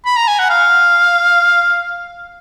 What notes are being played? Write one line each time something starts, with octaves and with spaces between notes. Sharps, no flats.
B5
A#5
G#5
F#5
F5